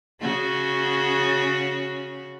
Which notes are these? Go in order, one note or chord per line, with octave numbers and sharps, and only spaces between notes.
C#3 C#4 F#4